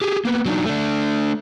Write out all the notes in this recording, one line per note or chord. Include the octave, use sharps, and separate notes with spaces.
G4 G#4
A#3 B3
F#3 D4 D#4
A3 D4